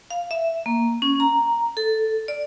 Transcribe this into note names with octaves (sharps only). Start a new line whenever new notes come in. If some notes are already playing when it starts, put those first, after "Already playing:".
F5
E5
A#3
C#4
A#5
A4
D5